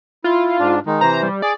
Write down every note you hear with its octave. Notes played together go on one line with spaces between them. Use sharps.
E4 F4
G#2 D4
D#3 G#3 D#4
C3 E3 C5 A#5
G3
G#4 D5